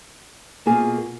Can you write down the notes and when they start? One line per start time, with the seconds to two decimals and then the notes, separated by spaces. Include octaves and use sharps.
0.66 B2 A#3 F4 G#4